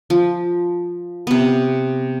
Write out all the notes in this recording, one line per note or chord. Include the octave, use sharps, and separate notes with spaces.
F3
C3 B3